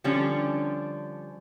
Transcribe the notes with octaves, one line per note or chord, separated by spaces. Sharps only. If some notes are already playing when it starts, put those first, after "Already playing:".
D3 F3 G3 C#4 D4